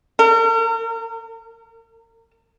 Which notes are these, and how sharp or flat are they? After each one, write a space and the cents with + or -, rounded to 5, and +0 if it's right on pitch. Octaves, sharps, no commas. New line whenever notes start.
A#4 -40